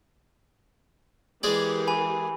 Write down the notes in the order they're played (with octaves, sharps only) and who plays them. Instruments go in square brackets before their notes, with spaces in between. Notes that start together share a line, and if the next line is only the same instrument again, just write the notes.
[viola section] E3 G4 A#4 [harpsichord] G#3 G#4 D5
[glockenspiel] G#5 B5